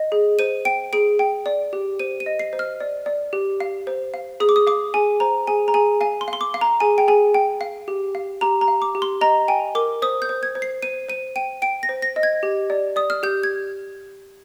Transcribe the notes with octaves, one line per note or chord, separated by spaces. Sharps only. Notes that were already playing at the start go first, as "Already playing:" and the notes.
Already playing: D#5
G#4
C5 D#7
G5 D7
G#4 D7
G5
D5
G4
C5 D#7
D#7
D#5
C7
C5
F6
D5
D5
G4
F5
C5
F5
G#4 D#6
D6
D#6
F5 D6
G#4 G#5
C5 A#5
G#4 G#5
A#5
G#4 G#5
F5 G#5
C6
F5
C6
D6
F5
A#5
G#4 G#5
G5
G#4 G#5
G5
F5
G4
F5
G4 A#5
A#5
F5
D6
G4
C6
D#5 A#5
G5 G#5
A#4 D6
C5 D#6
G6
C5
G#6
C5
C7
C5 D#7
C5 D#7
G5 D#7
G5 D7
A#6
C5
A#6
D#5
G#6
G4
D5
D5 D#6
F6
G4 G6
G#6